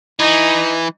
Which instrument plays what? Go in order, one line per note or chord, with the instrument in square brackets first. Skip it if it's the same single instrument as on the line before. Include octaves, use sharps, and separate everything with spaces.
[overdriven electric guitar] E3 [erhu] D#4